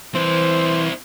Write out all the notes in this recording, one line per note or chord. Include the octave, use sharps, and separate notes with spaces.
E3 C4 E4 C5